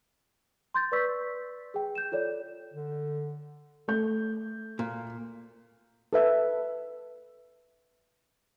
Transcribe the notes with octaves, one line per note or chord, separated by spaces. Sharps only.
C6 G6 A6
B4 D5 C#6 E6 B6
G#4 G5
G6 E7
F4 A4 C#5 D5
D3
A3 G6
A#2
A4 B4 E5